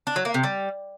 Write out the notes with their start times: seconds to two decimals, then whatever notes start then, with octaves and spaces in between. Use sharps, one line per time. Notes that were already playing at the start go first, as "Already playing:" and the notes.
0.07 D4
0.16 F#3
0.25 A#3
0.34 C3
0.43 G3